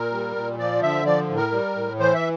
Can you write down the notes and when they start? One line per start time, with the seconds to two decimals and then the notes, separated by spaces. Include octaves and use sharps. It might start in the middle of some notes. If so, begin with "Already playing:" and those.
Already playing: A#2 A#4
0.12 G3
0.36 A#2
0.59 F3 D5
0.82 D3 E5
1.05 F3 D5
1.29 A2
1.37 A#4
1.52 G3
1.76 A2
1.99 E3 C5
2.15 E5